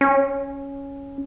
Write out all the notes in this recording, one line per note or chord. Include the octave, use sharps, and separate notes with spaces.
C#4